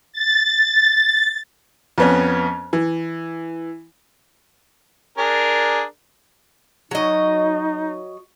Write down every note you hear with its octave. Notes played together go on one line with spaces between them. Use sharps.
A6
F2 B3 C#4
E3
D4 G#4 A#4
F#3 D#4 D#5